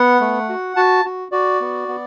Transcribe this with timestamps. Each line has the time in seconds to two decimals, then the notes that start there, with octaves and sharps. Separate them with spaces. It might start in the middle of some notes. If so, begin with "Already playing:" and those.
Already playing: B3 F#5
0.20 A3
0.49 F#4
0.76 F#4 A5
1.05 F#4
1.32 F#4 D5
1.61 B3
1.88 B3